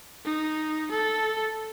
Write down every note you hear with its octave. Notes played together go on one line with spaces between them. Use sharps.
D#4
A4